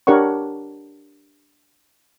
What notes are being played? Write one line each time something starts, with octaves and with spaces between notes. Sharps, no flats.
D4 G4 A#4 C#5 F#5 C#6